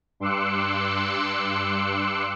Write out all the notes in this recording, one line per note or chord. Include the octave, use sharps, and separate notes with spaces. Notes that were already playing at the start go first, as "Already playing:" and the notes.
G2 C6 D6 E6 F#6 C#7